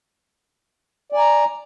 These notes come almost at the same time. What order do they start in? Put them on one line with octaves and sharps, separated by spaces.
D5 G#5 A#5